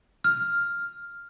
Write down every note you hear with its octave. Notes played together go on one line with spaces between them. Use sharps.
F6